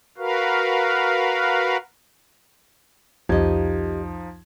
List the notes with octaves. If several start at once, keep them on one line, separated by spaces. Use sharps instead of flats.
F#4 A#4 B4 F5
C2 F2 F3 D#4 G4 D#5 G#6